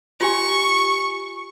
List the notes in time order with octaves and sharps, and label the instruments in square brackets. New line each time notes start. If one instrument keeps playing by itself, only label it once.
[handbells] F4 G4 G#5 [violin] C#6